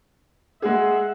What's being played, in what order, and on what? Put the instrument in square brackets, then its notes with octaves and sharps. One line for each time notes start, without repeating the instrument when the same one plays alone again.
[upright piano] G#3 G#4 [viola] E5 F#5